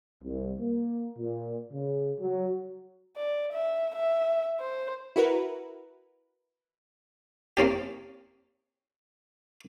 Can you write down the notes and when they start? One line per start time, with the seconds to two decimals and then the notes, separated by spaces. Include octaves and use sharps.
0.23 C2
0.59 A#3
1.17 A#2
1.72 C#3
2.20 F#3
3.17 D5
3.53 E5
3.95 E5
4.60 C5
5.16 E4 F#4 A#4 B4
7.57 A#3 C4 C#4 G4